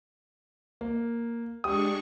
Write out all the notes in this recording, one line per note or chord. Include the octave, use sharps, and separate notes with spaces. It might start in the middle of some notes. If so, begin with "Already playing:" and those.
A#3
G#3 D4 G4 C#6 D#6